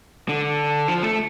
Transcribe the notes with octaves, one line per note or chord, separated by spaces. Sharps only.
D3
F3
A3